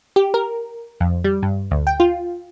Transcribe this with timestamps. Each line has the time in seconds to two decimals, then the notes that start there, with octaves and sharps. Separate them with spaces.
0.16 G4
0.34 A#4
1.00 F2
1.24 G3
1.42 G2
1.71 D2
1.87 G5
2.00 F4